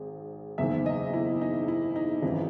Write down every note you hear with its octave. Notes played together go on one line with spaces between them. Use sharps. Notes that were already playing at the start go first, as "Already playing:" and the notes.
Already playing: G#1 G#2
F#1 E2 D#3 E5
D#5
E4
D#4
E4
D#4
G#1 F#2 E3 E4